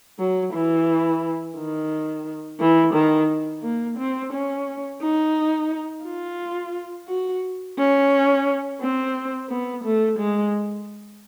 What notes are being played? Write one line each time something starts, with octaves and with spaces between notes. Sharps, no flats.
F#3
E3
D#3
E3
D#3
A#3
C4
C#4
D#4
F4
F#4
C#4
C4
B3
A3
G#3